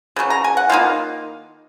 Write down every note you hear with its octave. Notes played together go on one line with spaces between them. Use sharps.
C#3 F#3 C#4
A#5
G#5
F#5
D#3 A#3 D#4 F4 F5